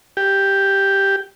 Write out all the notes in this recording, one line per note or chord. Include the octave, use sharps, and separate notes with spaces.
G4